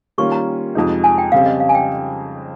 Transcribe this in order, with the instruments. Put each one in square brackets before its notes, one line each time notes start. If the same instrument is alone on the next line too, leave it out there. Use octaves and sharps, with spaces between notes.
[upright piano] D#3 G3 A#3 C#4 F4 [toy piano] C#6
[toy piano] A#5
[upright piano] F2 C3 F3 G#3 D#4
[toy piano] G#5
G5
[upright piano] F2 C#3 G3 C4 [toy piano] F5
[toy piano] D#5
F5
G#5
G5